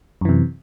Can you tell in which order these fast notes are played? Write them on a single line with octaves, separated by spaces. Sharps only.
F#2 E3 C3